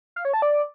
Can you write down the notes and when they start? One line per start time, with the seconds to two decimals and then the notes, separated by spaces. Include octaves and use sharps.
0.16 F5
0.25 C#5
0.34 A5
0.42 D5